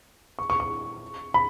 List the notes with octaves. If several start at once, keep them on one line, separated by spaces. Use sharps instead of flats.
C#6
C#6
C#6
B5